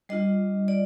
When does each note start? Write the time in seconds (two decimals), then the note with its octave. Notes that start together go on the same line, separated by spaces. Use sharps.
0.09 G3 D4 F4 D#5
0.68 D5